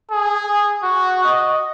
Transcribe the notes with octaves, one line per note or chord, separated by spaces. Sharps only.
G#4
F#4
D#5